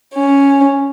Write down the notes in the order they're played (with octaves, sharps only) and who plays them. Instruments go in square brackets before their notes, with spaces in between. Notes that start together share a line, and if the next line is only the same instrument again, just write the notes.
[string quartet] C#4